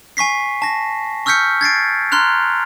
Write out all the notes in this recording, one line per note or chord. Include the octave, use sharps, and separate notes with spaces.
G#5 C#6 B6 C7
A5 A#6
C#6 E6 F6 G6 B6 C#7
G#6 A6 C7 D7
A#5 C6 F6 F#6 F7